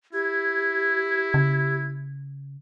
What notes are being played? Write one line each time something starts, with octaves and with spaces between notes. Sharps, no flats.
E4 G4 G#6
C#3